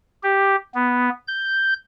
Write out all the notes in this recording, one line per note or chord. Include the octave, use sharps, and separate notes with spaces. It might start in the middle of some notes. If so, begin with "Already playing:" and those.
G4
B3
G6